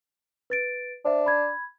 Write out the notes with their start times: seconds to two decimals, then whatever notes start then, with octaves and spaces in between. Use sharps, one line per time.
0.50 B4 A6 D7
1.05 D4 C5 E5
1.26 B5 G#6